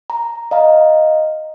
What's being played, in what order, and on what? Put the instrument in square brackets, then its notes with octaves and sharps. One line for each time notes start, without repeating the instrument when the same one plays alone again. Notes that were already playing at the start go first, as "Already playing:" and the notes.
[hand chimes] A#5
D#5 F5 A#5